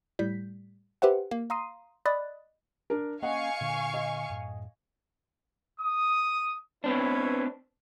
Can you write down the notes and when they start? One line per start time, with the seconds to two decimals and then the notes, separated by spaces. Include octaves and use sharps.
0.19 A2 G3 G6 B6
1.02 G4 B4 C5 E5 F#5
1.31 A#3
1.50 F5 A#5 C6 D#6 C7 D#7
2.05 D5 D#5 B5 D#6 F#6 A6
2.90 D4 A#4
3.22 A#3 C#4 D#5 F5 F#5 G#5 C#6
3.61 A#2 D3
3.94 D#5
4.30 F#2 A2
5.81 D#6
6.84 B3 C4 D4 E4 B4 C#5